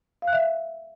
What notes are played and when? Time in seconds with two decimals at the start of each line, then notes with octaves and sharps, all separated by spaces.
0.22 F5
0.27 F#6
0.33 E5